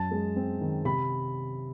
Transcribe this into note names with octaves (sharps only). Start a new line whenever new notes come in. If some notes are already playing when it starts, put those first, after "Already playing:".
Already playing: F#2 A5
G#3
C4
D#3
C3 B5